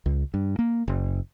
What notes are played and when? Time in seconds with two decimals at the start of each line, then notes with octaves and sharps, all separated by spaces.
0.06 C#2
0.34 G2
0.59 A#3
0.88 F#1